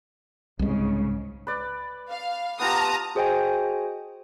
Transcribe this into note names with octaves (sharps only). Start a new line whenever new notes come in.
C2 G#2 C#3 G#3
B4 D5
F5
B3 F4 G4 A5 A#5 D#6
F#4 G#4 C5 D#5 G5 G#5